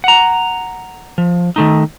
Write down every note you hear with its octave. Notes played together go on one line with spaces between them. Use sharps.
F#5 A#5
F3
D#3 A3 D#4